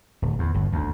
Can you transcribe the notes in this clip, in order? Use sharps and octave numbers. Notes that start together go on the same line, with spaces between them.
D1
E2
G1
D2